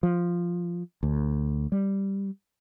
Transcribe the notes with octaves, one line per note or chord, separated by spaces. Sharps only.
F3
D2
G3